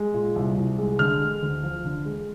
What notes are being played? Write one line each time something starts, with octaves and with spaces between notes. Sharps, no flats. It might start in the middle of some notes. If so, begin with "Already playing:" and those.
Already playing: G#3
A#2
C2
C2
G#3
D3 F6
G#3
D2
F3
D3
G#3